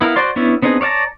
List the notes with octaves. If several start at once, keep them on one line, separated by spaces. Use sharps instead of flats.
B3 E4 A#4 F5
F#4 C5 D5 C6
B3 C#4 D4 E4
B3 C4 D4 D#4 G#4
C#5 D5 F5 A5 A#5